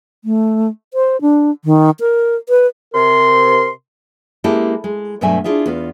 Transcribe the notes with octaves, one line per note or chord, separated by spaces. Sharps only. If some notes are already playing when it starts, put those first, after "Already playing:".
A3
C5
D4
D#3
A#4
B4
C3 A#4 C6
G#3 A#3 C#4 E4 G4 A4
G#3
G2 B2 F#3 A3 E5 G#5
D4 E4 F4 G#4 E5
E2 B3 F4